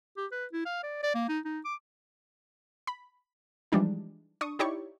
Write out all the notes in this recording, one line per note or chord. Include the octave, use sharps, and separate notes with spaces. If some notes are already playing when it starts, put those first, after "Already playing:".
G4
B4
E4
F5
D5
D5
A#3
D#4
D#4
D6
B5
E3 F3 G3 G#3 D4 D#4
D4 C#6 D#6
D#4 E4 G4 C#5 D5 C#6